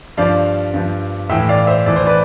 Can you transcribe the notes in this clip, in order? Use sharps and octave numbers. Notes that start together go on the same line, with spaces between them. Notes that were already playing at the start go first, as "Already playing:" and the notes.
G2 F3 D5 F5
G2 F3
A2 E3 E5 G5
D5 F5
C5 E5
A2 E3 D5
C5
B4 D5